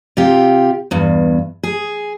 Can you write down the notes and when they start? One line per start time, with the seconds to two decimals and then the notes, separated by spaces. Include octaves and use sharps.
0.17 C3 F4 G4
0.91 E2 G2
1.63 G#4